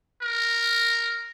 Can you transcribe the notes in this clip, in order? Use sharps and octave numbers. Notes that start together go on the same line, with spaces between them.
A#4